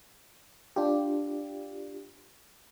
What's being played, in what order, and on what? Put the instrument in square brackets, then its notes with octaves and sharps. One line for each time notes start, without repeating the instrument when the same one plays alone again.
[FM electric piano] D4 F4 G4